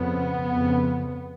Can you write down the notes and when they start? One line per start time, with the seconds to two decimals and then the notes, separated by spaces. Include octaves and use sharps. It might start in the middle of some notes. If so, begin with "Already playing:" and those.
Already playing: F2 C#3 B3
0.53 F2 C#3